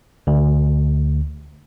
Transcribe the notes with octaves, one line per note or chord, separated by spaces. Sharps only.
D2